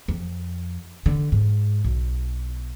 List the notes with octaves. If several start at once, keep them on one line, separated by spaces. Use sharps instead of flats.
F2
D3
G#2
B1